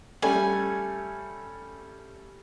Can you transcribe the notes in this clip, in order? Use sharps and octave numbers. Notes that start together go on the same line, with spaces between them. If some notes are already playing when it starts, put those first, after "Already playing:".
G3 A3 C#4 G#5